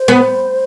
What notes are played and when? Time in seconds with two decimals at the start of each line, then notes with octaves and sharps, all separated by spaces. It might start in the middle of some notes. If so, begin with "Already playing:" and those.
Already playing: C5
0.08 B3